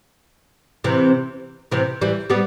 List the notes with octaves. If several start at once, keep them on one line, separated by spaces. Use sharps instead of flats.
C3 E3
C3 E3
E3 G3
G3 B3